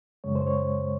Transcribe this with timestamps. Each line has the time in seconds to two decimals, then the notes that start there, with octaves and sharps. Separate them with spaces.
0.24 F#2 C#3 G#3 C#5
0.36 C5
0.46 C#5